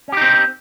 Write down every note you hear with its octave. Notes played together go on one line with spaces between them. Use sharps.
C4 C#4 D#4 G4